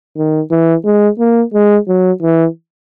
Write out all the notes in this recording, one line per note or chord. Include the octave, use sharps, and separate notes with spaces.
D#3
E3
G#3
A#3
G#3
F#3
E3